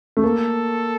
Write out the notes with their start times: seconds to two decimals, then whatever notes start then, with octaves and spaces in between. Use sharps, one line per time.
0.17 A3
0.24 A#3 A4